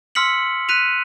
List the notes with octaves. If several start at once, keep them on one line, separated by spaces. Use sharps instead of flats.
C6 E6 F6 B6 C#7 F#7
F#6 B6 D#7 F7